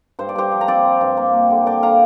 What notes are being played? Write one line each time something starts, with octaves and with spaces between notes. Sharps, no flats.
G2 C5
D5
G2 G4 C5
F3
A#5
C4 D5 G5
C4
G2
A#3
A#3
D3
A#3 D5 G5
D3 F5 A#5